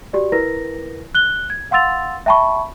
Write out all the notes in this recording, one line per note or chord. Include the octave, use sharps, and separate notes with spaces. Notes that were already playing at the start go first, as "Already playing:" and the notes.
F#4 G4 D5
E4 A#4 B4 A#6
F#6 G7
G#6
F5 F#5 C6 E6 A6 F7
E5 G5 A5 B5 C#6